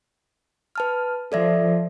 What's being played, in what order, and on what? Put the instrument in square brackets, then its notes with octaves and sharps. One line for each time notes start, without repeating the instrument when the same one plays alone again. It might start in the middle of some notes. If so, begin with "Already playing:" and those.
[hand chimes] B4 A5 F6
[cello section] F3 [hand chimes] A4 D5 E5